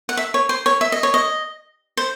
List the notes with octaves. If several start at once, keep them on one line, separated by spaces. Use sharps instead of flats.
F#5
E5
C#5
C5
C#5
E5
D#5
C#5
D#5
C5